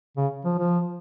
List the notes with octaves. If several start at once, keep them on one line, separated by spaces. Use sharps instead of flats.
C#3
F3
F3